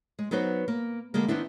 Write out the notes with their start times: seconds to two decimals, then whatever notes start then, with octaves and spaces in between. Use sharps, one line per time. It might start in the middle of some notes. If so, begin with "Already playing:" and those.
0.19 G#3
0.31 F#3 B3 D#4 F#4 B4 C5
0.68 A#3
1.14 D3 G3 G#3 A#3
1.28 D#3 B3 C4 D4 E4